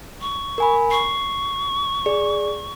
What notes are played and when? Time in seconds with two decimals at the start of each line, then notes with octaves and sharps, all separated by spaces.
0.21 C#6
0.58 A#4 G#5 B5
0.91 C#6 C7
2.06 G#4 D5